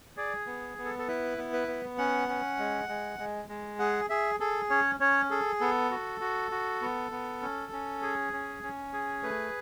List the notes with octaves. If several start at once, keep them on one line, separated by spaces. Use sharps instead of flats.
G#4 D5
B3
B3
A4
A4
E4 B4
B3
B4
B3
C#4 F#5
C#4
G#3
G#3
G#3
G#3
G#4 F#5
G#4 E5
G#4 A4
C#4 C#5
C#4 C#5
G#4 A4
B3 A4
F#4
F#4
F#4
B3
B3
C#4
C#4
G#4
C#4
C#4
G#4
A3 B4